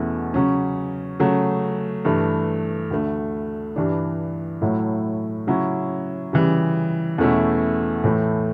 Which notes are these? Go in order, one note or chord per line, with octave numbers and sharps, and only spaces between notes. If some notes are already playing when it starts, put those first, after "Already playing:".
Already playing: E2 B2 A3 C#4 E4
C#3 F#3 C#4
C#3 F#3 A3
G2 E3 A3
D2 D3 A3
G2 E3 G3 D4
A2 F#3 A3 E4
C#3 F#3 C#4 E4
C#3 E3 G3
E2 B2 A3 C#4 E4
A2 E3 A3